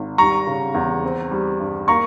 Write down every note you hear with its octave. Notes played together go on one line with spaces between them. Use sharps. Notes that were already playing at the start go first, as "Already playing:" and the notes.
Already playing: G#1
G3 A#5 C#6
C#3
E2
C4
G3
G2
A#3 A#5 C#6